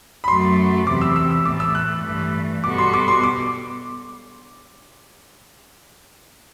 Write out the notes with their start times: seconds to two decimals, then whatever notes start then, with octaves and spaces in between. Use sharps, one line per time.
0.24 B5
0.27 F#2 F#3 A3 C6
0.87 E2 C3 E3 D6
1.01 E6
1.16 E6
1.31 E6
1.45 A2 E3 A3 D6
1.60 E6
1.75 F#6
2.04 G2 E3 A3
2.64 B2 G3 B3 F#4 A4 D6
2.78 C6
2.93 D6
3.08 C6
3.23 D6